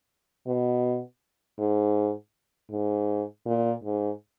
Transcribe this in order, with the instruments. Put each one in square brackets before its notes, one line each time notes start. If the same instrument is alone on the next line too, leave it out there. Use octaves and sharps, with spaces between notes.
[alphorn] B2
G#2
G#2
A#2
G#2